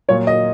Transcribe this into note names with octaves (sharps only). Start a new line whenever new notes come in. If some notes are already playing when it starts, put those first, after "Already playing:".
A#2 F#3 A#3 C#5
D#5